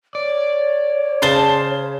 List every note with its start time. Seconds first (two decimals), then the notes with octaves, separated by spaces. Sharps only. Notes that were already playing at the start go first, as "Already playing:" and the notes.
0.15 C#5 D5
1.22 C#3 C5 A5 C6 G7